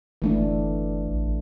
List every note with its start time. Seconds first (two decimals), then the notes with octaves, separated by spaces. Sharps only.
0.22 F#1 E3 A3 D4
1.09 A1